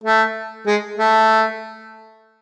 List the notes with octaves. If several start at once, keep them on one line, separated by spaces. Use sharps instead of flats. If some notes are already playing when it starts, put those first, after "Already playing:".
A3
G#3
A3